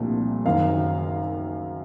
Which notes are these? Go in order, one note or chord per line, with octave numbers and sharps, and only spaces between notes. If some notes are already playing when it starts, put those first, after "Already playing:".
Already playing: C2 A#2 F3 A3 D4
F#1 F#2 D#3 F5